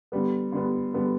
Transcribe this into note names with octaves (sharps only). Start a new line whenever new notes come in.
D3 G3 B3
D3 G3 B3
D3 G3 B3